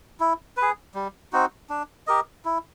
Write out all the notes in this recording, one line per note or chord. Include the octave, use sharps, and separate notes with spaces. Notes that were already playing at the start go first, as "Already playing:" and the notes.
E4
B4
G#4
G3
C4 D#4 F#4
D4
G4 A#4 D#5
E4